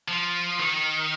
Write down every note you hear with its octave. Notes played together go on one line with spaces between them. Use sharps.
F3
D#3